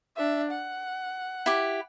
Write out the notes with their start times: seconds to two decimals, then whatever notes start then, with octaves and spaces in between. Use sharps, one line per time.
0.17 D4 E5
0.50 F#5
1.46 E4 G4